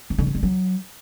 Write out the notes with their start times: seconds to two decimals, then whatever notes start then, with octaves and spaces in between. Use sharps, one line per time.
0.10 D#3
0.18 D3
0.27 D#3
0.35 G3
0.43 F#3